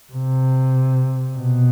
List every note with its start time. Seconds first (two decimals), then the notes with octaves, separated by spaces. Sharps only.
0.13 C3
1.36 B2